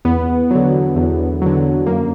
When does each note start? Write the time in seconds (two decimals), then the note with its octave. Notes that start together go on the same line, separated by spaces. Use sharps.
0.05 E2 B3
0.51 D3 F#3
0.96 E2
1.41 D3 F#3
1.87 F#2 A#3